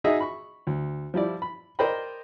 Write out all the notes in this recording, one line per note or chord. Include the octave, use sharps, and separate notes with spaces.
D#4 F#4 G#4 D#5 E5
B5 C#6
D2
F3 G3 E4 D5
B5
A#4 C5 D5 D#5 G5 B5